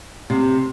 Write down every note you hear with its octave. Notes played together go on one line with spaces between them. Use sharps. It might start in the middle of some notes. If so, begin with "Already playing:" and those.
C3